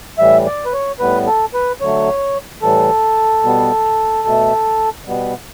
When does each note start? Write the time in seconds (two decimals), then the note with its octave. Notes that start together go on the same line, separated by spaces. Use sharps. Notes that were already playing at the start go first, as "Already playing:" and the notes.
0.18 A2 E3 G3 E5
0.46 D5
0.65 B4
0.73 C#5
1.00 A2 G3 B3 B4
1.27 A4
1.54 B4
1.81 D3 F#3 A3 C#5
2.62 A2 E3 G3 A4
3.43 B2 G3 B3
4.24 B2 A3
5.06 B2 G3 B3